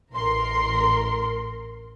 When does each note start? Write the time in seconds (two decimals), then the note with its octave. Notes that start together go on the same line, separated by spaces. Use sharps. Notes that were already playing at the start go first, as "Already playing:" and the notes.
0.12 A1 A#4 C6